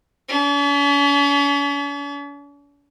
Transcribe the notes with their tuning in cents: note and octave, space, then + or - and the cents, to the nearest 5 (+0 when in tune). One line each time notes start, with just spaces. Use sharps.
C#4 +45